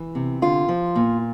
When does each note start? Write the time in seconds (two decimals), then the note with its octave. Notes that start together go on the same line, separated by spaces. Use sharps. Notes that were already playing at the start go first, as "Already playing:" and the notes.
Already playing: E3
0.15 C3
0.42 D3 F4
0.68 F3
0.96 A#2